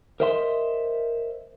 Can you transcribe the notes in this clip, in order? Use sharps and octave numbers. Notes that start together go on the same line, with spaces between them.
A#4 C5 D#5 E5 A#5 C6